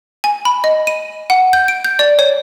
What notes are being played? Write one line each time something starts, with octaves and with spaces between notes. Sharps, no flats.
G#5
B5
D#5
D#7
F#5
G6
D7
G6
D5
C#5